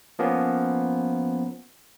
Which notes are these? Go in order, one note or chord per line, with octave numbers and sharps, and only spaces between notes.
F3 A#3 B3 C#4